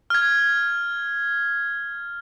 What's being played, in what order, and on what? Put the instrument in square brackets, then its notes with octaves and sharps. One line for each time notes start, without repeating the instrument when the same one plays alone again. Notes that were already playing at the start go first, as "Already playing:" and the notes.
[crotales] F6 G#6